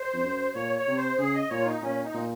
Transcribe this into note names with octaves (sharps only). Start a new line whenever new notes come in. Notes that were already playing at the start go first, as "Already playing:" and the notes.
Already playing: C5
F2
F#2
A#2 C#5
C#5
C3
C5
C#3 G#4
D#5
A#2 C#5
F4
D#4
A#2 C#4
D#4
A#2